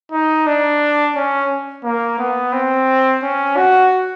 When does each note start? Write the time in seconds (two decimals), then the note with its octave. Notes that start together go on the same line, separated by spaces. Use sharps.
0.12 D#4
0.47 D4
1.15 C#4
1.84 A#3
2.19 B3
2.53 C4
3.23 C#4
3.57 F#4